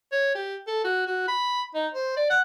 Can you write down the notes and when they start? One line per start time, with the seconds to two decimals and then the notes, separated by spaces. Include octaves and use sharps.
0.12 C#5
0.35 G4
0.67 A4
0.84 F#4
1.07 F#4
1.28 B5
1.74 D#4
1.94 C5
2.16 D5
2.30 F#5